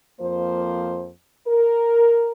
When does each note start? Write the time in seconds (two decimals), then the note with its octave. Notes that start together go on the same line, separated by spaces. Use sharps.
0.20 F2 F3 A#3 C5
1.48 A#4